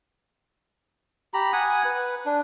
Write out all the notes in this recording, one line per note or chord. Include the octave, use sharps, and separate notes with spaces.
G4 A#5 B5
F#5 G#5 D#6
B4
D4